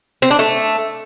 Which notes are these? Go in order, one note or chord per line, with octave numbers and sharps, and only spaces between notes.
C4
D4
A3